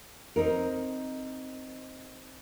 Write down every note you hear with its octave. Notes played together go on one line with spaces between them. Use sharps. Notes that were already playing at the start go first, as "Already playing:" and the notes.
C4 D#4 A#4